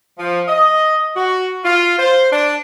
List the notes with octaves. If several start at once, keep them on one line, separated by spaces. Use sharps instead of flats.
F3
D#5
F#4
F4
C5
D4